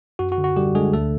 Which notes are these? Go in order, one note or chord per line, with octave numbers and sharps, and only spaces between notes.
F#2 F#4
F#4
D3
F#4
D3 G3 G4
D3 G#3 G#4
D2 A3 A4